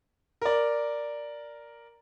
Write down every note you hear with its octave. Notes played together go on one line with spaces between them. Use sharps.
A#4 D5